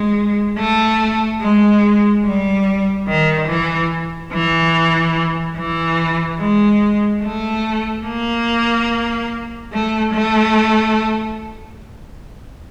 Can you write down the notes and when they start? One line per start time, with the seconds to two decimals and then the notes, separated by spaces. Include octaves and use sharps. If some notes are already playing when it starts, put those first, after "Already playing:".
Already playing: G#3
0.58 A3
1.42 G#3
2.24 G3
3.08 D#3
3.48 E3
4.32 E3
5.57 E3
6.40 G#3
7.23 A3
8.06 A#3
9.73 A3
10.14 A3